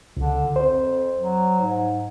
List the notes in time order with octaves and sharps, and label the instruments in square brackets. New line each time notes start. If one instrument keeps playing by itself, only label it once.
[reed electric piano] C#2 [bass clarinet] D3
[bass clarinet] F2 [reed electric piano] C5
[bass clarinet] F#3
G#2